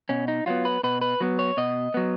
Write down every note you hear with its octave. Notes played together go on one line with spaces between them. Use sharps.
B2 C#4
D#4
F#3 B3 F4
B4
B2 B4
B4
F#3 B3
C#5
B2 D#5
F#3 B3